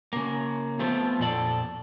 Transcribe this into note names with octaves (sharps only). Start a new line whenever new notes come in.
C#3 A#3
F3 A3 B3 C4 F4
F2 A#2 A4 D5